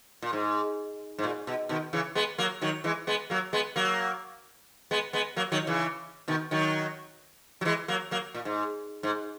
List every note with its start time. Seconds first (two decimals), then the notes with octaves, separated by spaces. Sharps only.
0.22 A#2
0.33 G#2
1.19 G#2
1.24 A#2
1.47 B2
1.69 B2 D#3
1.93 C#3 E3
2.15 G#3 B3
2.38 F#3 A#3
2.61 D#3 F#3
2.84 E3 G#3
3.07 G#3 B3
3.30 F#3 A#3
3.53 G#3 B3
3.76 F#3 A#3
4.91 G#3 B3
5.13 G#3 B3
5.36 F#3 A#3
5.52 D#3 F#3
5.67 C#3 E3
6.28 B2 D#3
6.51 D#3 F#3
7.61 F#3
7.65 E3 G#3
7.88 F#3 A#3
8.11 F#3 A#3
8.34 A#2
8.45 G#2
9.03 G#2